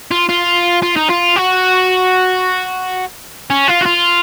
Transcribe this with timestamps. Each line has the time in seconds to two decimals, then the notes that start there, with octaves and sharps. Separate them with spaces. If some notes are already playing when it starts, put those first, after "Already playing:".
0.11 F4
0.29 F4
0.83 F4
0.96 D#4
1.10 F4
1.36 F#4
3.50 C#4
3.68 F4
3.81 F#4
3.86 F4